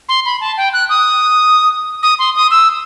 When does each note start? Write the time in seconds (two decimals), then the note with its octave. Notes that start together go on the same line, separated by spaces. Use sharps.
0.09 C6
0.25 B5
0.41 A5
0.57 G5
0.73 F#6
0.89 D#6
2.03 D#6
2.19 C6
2.36 D#6
2.51 E6